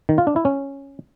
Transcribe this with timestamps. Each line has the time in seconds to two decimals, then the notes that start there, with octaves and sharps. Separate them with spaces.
0.09 D#3
0.18 F4
0.27 D4
0.36 E4
0.45 C#4